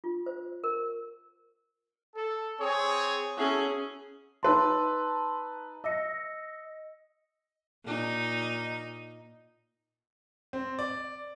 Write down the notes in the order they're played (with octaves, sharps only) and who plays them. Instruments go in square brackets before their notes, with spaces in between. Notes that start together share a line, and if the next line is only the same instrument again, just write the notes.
[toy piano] F4
C5
A#4
[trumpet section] A4
C4 G#4 C#5
[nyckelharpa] C#4 G#4 [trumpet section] E4 F#4 A4
[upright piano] D#4 B4 A5 [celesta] C6 E6
[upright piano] D#5 [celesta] E6 A#6 C#7
[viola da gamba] A#2 D#4
[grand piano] C4
D5